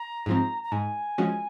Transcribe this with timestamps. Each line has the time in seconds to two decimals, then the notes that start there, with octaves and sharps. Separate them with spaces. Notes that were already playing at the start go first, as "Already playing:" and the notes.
Already playing: A#5
0.26 G#2 F3 C4
0.63 A#5
0.72 G#2 G#5
1.18 F3 G#3 C#4 F#4